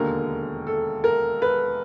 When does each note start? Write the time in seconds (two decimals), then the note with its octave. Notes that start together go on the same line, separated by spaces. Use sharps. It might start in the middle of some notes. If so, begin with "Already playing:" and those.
Already playing: E1 D#2 D3 A#4
0.67 A4
1.04 A#4
1.42 B4